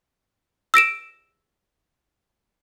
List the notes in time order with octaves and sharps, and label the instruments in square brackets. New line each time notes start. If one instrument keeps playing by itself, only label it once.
[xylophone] E6 A#6 D7 E7